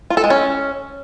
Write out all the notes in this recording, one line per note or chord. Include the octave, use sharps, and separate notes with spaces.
F4
A4
G#3
C#4